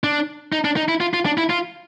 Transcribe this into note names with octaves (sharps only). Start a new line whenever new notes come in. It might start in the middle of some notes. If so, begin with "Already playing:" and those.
D4
D#4
D4
D#4
E4
F4
F4
D4
E4
F4